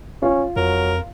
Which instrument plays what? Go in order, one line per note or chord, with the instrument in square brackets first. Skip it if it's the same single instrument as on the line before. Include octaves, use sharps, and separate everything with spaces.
[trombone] C#4 [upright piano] F4
[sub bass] F2 [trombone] F#3 [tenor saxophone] A#4